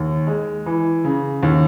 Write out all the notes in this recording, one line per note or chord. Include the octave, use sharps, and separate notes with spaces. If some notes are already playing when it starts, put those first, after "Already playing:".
Already playing: D#2
G#3
E3
C#3
D#2